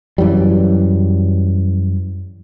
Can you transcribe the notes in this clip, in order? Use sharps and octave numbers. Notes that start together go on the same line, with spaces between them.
F#2 E3 F#3 G3